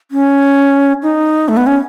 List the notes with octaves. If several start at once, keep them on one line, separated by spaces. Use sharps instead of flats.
C#4
D#4
A3
B3
C#4